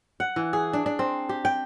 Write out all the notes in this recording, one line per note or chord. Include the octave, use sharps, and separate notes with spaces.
F#5
E3
G#4
D4
D4
C4
G4
G5